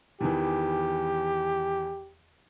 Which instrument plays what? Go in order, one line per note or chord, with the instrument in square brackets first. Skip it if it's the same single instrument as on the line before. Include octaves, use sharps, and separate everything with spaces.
[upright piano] E2 D#3 E3 [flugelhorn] G4